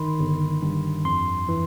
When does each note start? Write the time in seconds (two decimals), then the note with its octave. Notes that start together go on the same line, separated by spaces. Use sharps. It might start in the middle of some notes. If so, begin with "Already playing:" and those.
Already playing: G1 D#3 B5 C6
0.19 G1
0.62 G2
1.05 F2 C6
1.48 E3